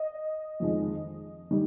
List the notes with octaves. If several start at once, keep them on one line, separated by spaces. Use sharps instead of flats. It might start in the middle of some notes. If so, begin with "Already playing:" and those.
Already playing: D#5
F2 D#3 G#3
D#3 G3